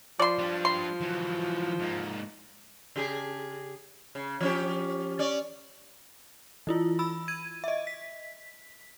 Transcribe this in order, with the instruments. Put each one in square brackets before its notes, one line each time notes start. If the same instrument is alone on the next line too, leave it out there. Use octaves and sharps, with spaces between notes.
[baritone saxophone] F3 [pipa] D5 C6
[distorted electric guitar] G3 D4
[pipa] C6
[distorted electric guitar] E3 F#3
G#2 A#3
[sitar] C#3 G4 G#4
C#3
F3 C#4 G4
C#4 D5
[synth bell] E3 E4 F4
B5 E6
G#6 D#7
D#5 E5
B6